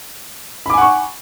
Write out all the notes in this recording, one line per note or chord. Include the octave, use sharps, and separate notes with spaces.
F#5 G#5 B5 C#6 D6